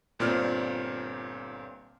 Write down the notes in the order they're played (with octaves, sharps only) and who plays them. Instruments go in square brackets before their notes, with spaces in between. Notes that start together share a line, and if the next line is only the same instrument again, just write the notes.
[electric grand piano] G1 A#2 C4 D5 F6